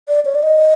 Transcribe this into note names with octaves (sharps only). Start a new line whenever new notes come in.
D5
C#5
D5
D#5